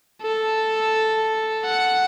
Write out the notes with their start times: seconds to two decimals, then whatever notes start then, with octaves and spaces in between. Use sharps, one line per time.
0.22 A4
1.65 F#5